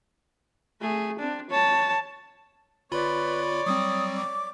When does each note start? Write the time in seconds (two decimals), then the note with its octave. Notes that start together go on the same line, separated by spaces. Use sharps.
0.81 A3 G#4
1.19 C4 D4
1.50 C#5 A5
2.92 G1 F4 B4 C#5 D5 B5
3.66 F#3 G3 C4 D#6
4.16 D6